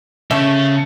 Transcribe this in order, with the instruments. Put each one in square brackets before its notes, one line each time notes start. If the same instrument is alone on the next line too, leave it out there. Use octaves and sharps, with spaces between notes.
[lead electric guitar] C#3 C#4 [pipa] A3 E5